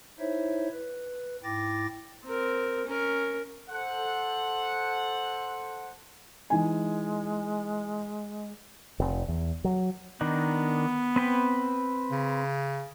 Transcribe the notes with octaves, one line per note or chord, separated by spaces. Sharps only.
D#4 E4 C5 C#5 E5
B4
G#2 E4 G5 D6 A6 A#6
C4 A#4
C#4 A#4
A4 C5 F#5
E3 G#3 D#4 G#5
F1
E2
F#3
D#3 B3 D4 D#4
C4 B4 G5
C#3